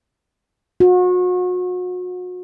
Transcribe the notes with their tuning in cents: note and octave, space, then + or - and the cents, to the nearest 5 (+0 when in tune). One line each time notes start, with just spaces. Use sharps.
F#4 -35